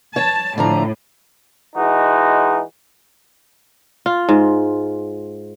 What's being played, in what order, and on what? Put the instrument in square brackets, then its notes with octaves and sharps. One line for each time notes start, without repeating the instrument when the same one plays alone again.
[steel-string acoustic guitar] C#5 [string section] A5
[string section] A2 [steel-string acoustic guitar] D3 F3 A#5
[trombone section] E3 G#3 D#4 F#4
[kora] F4
G#2